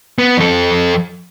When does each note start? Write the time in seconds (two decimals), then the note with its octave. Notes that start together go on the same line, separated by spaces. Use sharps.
0.18 B3
0.38 F2 A4